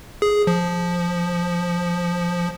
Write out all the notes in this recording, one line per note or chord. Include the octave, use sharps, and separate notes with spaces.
G#4
F3